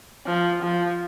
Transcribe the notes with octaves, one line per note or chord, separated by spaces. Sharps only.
F3
F3